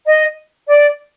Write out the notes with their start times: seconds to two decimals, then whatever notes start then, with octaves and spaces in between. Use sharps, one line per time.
0.06 D#5
0.68 D5